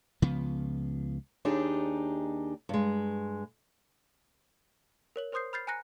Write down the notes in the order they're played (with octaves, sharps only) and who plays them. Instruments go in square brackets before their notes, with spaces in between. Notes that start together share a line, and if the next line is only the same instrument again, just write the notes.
[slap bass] C#2 C#3 F3 B3
[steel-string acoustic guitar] D#2 D4 D#4 G4 G#4
G2 G#3
[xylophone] A#4 C#5 F#7
A#4 C5 C6 D#6 G6 C7
B5 F6 G6 A6 C7
G#5 A#5 F#6 A#6 C#7